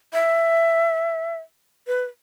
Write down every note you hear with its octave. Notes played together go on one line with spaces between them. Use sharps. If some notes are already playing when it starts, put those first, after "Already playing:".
E5
B4